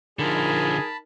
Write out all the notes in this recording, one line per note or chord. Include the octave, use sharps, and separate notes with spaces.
D3 F3 D#4 G#4 A#4 A5 B5